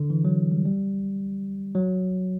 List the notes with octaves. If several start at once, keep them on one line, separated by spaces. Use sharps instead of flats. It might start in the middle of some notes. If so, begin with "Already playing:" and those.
Already playing: D3
E3
F#3
G3
G3
F#3